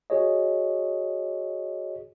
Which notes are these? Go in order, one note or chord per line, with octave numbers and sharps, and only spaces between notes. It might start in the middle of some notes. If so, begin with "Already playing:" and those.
F#4 G#4 C#5 D#5